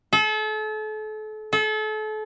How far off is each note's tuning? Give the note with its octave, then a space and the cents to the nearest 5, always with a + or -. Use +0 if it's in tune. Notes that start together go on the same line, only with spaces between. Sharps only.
A4 -35
A4 -35